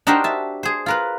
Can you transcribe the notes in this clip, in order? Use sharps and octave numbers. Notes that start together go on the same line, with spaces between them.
D4 D#4 F#4 G4 A#4 C5
E5 A5
G#4 C5
F4 A#4 B4